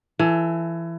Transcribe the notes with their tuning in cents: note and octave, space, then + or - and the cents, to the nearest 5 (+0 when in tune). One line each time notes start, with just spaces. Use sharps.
E3 +20 A4 +0